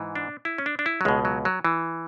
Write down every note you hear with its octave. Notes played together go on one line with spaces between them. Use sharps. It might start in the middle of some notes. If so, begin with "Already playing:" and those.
Already playing: G#2 E3
D4
E4
C#4
D4
D4
E4
F#3
C#2 B2 G#3
F#3
F#3
E3